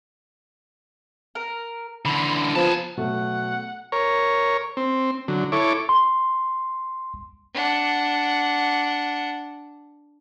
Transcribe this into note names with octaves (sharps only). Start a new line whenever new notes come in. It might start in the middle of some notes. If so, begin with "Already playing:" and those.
A#4
D3 E3 B5 C6
F3 B3 G#4 A5
B2 F#3 A3 F#5
A#4 C#5
C4
D3 F#3
E4 A4 C#5 D6
C6
D4 F#5